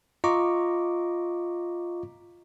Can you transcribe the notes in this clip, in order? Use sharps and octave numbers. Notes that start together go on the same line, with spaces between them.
F4 D#5 A#5 C#6 D6